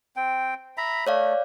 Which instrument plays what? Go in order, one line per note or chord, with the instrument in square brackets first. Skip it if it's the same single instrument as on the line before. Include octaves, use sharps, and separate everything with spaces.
[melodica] C4 G5
E5 A#5 B5
[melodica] A3 [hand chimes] C#5 D5 F5